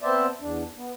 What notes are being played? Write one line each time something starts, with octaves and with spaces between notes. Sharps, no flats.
B3 C4 C5 D5 E5 A5
E2 D4
B3